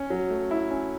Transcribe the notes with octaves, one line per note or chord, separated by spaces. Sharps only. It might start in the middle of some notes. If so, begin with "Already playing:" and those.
Already playing: C#4
F#3
A3
E4
C#4